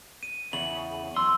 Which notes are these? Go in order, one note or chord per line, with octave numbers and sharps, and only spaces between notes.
D#7
E2 C#3 F#7
F#2 C6 E6